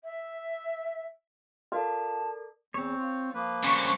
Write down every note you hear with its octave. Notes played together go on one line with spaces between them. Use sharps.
E5
F4 A4 A#4 D5 A5
E2 C4 C#5
F4
F3 A#3 B4
G2 C#3 C5 F#5 G#5 C#6